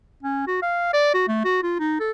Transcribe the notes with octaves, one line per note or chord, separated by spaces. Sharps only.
C#4
F#4
F5
D5
F#4
A3
F#4
F4
D#4
A4